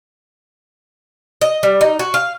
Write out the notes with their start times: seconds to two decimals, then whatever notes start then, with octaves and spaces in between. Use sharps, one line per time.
1.41 D#5
1.63 G3
1.81 D#4
1.99 F#4
2.14 F5